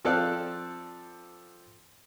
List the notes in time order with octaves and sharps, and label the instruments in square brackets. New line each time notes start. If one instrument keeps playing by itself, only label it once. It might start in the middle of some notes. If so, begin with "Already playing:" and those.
[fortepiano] F3 C4 A4 D5 F5 F#6